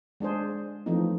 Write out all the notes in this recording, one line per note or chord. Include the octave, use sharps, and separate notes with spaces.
G#3 D4 G#4 C5
E3 F3 A3 C4 D#4